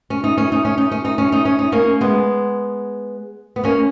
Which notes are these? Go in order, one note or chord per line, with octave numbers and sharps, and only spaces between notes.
C#4
D#4
C#4
D#4
C#4
D#4
C#4
D#4
C#4
D#4
C#4
D#4
A#3 C#4
G#3 B3
B3
A#3 C#4